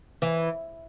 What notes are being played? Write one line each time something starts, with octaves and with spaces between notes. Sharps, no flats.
E3